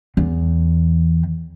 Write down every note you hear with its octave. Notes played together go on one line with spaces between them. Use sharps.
E2